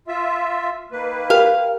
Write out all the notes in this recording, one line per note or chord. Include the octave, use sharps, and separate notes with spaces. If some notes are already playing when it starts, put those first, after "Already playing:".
F4 E5
D#3 A#3 B4
G4 A#4 F5